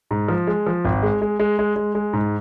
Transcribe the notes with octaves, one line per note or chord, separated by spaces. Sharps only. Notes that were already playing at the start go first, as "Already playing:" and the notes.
G#2
F3
G#3
F3
G#1
G#3
G#3
G#3
G#3
G#3
G#3
G#2